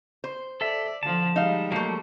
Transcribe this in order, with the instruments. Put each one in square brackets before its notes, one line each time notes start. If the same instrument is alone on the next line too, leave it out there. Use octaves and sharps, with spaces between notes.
[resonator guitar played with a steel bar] C5
[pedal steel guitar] A4 E5 [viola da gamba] D5
[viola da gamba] D3 F3 [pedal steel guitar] A5
[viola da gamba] G3 G#3 [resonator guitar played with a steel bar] D#4 F5
[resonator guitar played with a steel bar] F3 A3 [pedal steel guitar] F#3 A#3